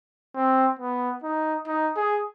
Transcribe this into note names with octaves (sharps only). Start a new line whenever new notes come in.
C4
B3
D#4
D#4
G#4